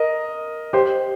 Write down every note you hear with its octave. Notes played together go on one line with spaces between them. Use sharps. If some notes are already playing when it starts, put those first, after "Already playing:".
Already playing: A#4 D#5
G4 C5